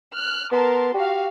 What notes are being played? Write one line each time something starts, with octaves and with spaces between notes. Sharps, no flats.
F6 F#6
B3 A#4 A5 C6
F#4 G4 F5